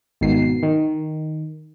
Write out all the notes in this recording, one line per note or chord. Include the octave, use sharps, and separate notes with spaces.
G#1 B2 D#3 C7
D#3